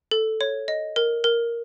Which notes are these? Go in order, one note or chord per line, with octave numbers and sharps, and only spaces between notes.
A4
C#5
D#5
A#4
A#4